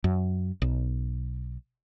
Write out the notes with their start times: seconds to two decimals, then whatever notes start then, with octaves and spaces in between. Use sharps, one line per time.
0.04 F#2
0.62 B1